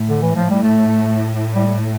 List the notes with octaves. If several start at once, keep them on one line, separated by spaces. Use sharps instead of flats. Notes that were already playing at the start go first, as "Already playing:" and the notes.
Already playing: A2
D3
E3
F3
G3
A3
G3